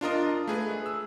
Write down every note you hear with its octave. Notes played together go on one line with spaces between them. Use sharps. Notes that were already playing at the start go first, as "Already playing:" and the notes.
D4 F4 A#4 D#5
A3 G#4 B4
E6